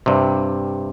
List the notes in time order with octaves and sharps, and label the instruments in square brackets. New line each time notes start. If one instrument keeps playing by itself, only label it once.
[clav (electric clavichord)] G2 C3